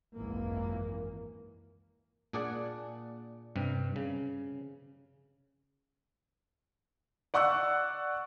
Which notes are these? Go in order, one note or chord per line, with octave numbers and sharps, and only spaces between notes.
G#1 C#2 F#2 E3 A#3
A#2 D4 G#4 D5 F#5
G2 C3
C#3
D5 F#5 C#6 E6 F#6